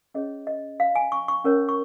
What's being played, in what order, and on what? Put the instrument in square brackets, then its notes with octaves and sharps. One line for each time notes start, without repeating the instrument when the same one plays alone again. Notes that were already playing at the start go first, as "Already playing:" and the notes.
[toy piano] C#4 G#4 C#5 D#5
D#5
F5
G#5
C#6
C#6
C#4 A#4 C#5
C#6